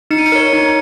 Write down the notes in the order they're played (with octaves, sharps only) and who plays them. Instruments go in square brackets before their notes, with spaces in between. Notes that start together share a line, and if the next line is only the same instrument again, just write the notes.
[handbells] D#4 [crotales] C#7
[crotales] D#7
C#7
[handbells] A#4 C#5
D#4